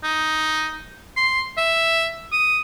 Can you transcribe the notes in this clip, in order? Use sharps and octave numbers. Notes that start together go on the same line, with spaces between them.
D#4
C6
E5
D#6